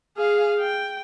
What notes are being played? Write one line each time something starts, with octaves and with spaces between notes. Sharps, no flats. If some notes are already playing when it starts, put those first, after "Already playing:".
G#4 F5
G5